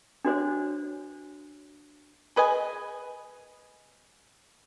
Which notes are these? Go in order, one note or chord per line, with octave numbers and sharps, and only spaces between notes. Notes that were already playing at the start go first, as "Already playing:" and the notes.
D4 F#4 C5 C#5
G#4 B4 D#5 G#5